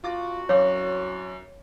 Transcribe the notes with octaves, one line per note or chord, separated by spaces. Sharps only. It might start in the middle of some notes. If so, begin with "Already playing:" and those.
C2 F4 F#4 D6 A6
F#2 C#5 F5 D6